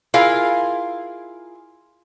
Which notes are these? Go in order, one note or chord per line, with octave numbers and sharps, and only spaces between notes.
E4 F4 G#4 A#4 F5